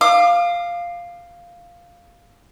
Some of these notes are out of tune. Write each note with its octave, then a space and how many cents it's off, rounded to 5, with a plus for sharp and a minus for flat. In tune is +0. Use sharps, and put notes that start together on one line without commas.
F5 +0 D6 +45